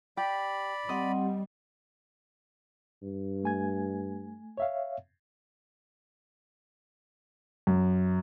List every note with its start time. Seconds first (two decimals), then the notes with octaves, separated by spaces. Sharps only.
0.17 G4 D5 B5
0.89 G3 C4 D#5 F#5
3.03 G2
3.44 A3 G#5 G#6
4.57 C#5 E5 F5
7.67 F#2